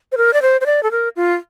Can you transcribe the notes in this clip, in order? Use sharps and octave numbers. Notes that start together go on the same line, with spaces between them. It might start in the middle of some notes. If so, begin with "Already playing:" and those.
C5
A#4
D5
C5
C5
D5
A4
A#4
F4